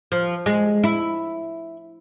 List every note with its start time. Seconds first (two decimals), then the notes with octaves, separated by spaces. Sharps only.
0.12 F3
0.46 G#3
0.84 E4